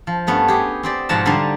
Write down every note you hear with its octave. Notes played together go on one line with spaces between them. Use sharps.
F3
G2 A3 B3 C#4
G4 G#4
C4 G4 D5
G#2 B2 F3 F#5 A5 A#5
D3 G3 D#4 D5 F5 C6